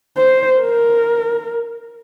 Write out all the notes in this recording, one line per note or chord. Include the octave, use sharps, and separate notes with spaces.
C5
A#4